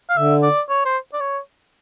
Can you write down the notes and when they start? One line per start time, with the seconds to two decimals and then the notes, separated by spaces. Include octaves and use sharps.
0.09 F5
0.17 D3 E5
0.43 D5
0.69 C#5
0.85 C5
1.14 D5
1.20 C#5